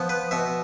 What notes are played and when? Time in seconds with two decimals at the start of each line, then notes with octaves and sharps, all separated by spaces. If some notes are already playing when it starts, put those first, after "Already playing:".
Already playing: F3 B3
0.09 B4
0.31 B2 E5